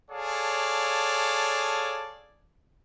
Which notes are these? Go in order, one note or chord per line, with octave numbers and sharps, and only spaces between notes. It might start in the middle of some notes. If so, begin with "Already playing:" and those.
G#4 A4 C#5 D5 F5 A5